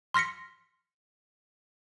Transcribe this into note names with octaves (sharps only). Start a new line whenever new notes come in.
C6 F6 A#6 B6 C#7